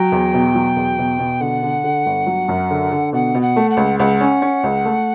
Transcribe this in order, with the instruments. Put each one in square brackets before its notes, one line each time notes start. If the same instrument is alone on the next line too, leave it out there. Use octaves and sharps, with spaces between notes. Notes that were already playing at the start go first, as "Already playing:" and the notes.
Already playing: [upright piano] F#3 [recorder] G5
[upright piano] E2
B2
F#3
E2
B2
B2
[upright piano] D3 [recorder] F#5
[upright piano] D3
D3
G1
F#3
F#2
D3
D3
[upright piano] B2 [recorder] F#5
[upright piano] B2
[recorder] F#5
[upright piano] A3
[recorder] F#5
[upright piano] C#2
[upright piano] C#2 [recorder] F#5
[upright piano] C#4
C#4
C#2
A3